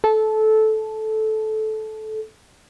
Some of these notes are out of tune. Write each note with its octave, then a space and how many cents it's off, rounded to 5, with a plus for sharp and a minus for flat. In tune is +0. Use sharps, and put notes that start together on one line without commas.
A4 -15